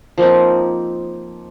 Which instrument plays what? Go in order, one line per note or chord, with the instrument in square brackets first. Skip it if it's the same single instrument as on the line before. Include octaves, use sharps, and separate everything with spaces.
[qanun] F3 A#3 C4 D#4